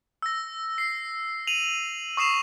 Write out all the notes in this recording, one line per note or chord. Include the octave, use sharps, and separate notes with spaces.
E6 A#6
C7
D#7 F7 F#7
C#6 D#6 C7 E7 F7